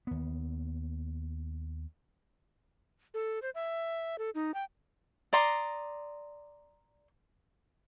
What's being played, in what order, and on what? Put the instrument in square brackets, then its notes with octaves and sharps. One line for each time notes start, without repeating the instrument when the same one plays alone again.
[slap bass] D#2 B3
[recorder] A4
C5
E5
A4
D#4
G5
[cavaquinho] D5 A#5 C6 D#6